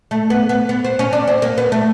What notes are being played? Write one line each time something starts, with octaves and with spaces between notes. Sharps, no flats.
A3
B3
B3
B3
C4
C#4
D4
C4
A#3
B3
A3